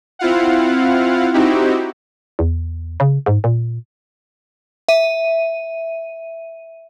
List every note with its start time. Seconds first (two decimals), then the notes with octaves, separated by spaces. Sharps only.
0.19 C4 E4 F4 F5 F#5
1.33 C4 D#4 E4 F#4 G4
2.39 E2
3.00 C#3
3.26 G#2
3.44 A#2
4.89 E5 D#7